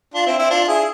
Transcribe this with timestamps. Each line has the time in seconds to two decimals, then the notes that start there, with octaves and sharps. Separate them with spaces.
0.14 D4 F4
0.26 C4 E4
0.38 C4 E4
0.50 D4 F4
0.64 F4
0.68 E4 G#4